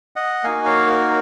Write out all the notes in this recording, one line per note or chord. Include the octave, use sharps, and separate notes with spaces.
D#5 F#5
A#3 D#4 F#4 F5 G#5
C#5 F5
A#4